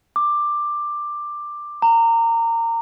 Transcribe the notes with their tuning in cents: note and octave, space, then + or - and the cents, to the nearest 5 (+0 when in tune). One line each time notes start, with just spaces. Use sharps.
D6 +10
A#5 -25